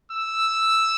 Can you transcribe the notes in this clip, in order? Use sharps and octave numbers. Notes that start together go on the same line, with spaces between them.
E6